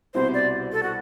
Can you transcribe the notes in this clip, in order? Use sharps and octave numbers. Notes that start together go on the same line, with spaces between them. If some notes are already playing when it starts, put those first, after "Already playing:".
C2 B2 G3 C4 E4 C5
D5
A4
F#4